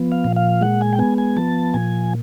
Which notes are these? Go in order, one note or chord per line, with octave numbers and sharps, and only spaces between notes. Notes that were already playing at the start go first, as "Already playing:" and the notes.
Already playing: F3 B3
F5
A#2
F5
G#3 F#5
G#5
G5
B3 G#5
G#5
F3 A5
A#2 G#5